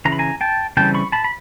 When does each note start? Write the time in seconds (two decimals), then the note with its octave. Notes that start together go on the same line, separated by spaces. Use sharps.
0.05 C#3 E3 A#5
0.12 B5
0.19 G#5 A#5
0.41 G5 A5
0.77 C#3 E3 G3 C4 G5 A5
0.94 B5 C#6
1.12 A5 B5
1.24 B5